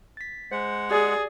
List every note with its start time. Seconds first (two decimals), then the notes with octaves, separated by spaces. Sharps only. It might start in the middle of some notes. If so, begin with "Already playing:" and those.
0.17 A6 B6
0.51 G#3 C5 F#5
0.91 G4 G#4 D5 D#6